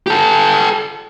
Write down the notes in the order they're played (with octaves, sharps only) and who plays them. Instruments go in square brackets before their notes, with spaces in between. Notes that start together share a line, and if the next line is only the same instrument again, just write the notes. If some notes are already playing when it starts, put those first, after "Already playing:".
[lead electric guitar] G4 A4